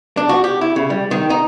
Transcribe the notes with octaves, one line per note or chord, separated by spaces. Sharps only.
D4
F#4
G4
E4
C#3
G3
D#3
D#4